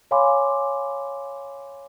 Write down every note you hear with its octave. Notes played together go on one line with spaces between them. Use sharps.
C#5 F5 G#5 B5 C6 D6